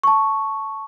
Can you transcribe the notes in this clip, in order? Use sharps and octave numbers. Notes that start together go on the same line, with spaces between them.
A5 C#6